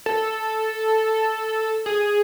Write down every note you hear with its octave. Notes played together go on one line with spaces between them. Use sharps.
A4
G#4